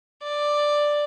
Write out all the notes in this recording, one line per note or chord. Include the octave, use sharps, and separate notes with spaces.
D5